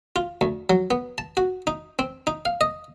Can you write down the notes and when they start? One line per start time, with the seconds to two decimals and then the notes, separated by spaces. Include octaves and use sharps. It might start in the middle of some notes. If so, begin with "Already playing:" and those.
0.16 F4
0.41 D2
0.70 F#3
0.91 B3
1.18 A5
1.37 F#4
1.67 D#4
1.99 C4
2.27 D#4
2.45 F5
2.61 D#5